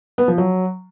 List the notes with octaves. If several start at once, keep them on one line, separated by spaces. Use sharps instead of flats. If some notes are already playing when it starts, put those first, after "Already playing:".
B3
F3
F#3